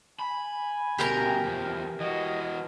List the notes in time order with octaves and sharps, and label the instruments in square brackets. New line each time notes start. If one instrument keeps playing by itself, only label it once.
[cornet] G#5 [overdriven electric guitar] B5
[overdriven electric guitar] D2 B2 [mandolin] G4 A#4 A#5
[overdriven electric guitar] E2 F3
[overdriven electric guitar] E3 F#4 [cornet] D#5